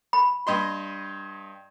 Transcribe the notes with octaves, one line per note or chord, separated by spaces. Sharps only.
B5
G2 D#5 C6